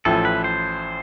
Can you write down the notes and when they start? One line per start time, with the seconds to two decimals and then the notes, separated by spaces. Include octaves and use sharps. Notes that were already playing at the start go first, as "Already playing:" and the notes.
0.05 A1 A2 F3 A4
0.25 B4
0.44 C5